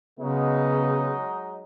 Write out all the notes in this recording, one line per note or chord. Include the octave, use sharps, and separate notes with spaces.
C#3 F#3 G#3 B3 D#4